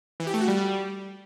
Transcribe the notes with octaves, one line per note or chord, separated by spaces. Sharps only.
E3
G4
A3
F#4
G3